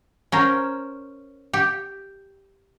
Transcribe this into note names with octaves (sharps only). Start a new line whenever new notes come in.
C#4 A#4 C5
G4